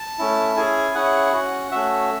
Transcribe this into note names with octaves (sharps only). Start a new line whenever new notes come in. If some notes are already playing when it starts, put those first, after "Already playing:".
Already playing: A5
A3 C#4 E4
C#4 E4 G#4 G#5
C#4 E4 G#4 F#5
C#4 F#4
A3 C#4 F#4 E5